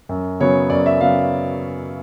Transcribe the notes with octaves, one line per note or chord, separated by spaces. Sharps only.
F#2
C#3 F#3 B3 C#5
F#2 D5
E5
C#3 F#3 B3 F5